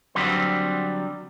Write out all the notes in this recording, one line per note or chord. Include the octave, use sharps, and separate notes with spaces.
D3 F#3 G3 C4 B4